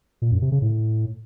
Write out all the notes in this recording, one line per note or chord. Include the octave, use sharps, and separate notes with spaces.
A#2
F#2
C3
C#3
A2